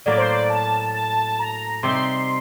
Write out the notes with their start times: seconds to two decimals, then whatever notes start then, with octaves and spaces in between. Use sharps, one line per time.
0.06 A2 F#3 A#3 D5
0.18 C5
0.30 D5
0.50 A5
0.94 A5
1.09 A5
1.24 A5
1.39 A#5
1.83 C3 G3 C4 D#4 C6